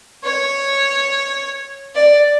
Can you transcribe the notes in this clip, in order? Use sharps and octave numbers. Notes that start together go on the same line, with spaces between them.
C#5
D5